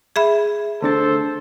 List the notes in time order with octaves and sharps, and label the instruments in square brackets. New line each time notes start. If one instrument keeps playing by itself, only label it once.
[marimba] G#4 E5 B5
[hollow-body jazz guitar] D2 D4 A5 [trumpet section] A4 C5